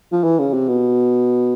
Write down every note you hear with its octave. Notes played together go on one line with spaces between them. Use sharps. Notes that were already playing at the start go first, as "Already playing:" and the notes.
F3
E3
C#3
C3
B2